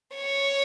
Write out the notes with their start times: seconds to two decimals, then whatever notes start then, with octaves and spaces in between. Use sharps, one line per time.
0.16 C#5